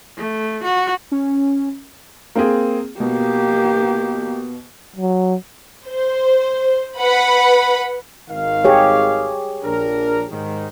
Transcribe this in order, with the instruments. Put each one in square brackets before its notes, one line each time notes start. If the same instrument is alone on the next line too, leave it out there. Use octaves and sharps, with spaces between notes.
[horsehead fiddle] A3
F#4
[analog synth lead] C#4
[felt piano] A#3 C4 G#4
[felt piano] B2 [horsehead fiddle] A#3 G4
[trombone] F#3
[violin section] C5
B4 F#5 B5
[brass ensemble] G#1 D#3 F5
[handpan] G4 G#4 C#5
[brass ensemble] A#1 D4 A#4
G#2 D#3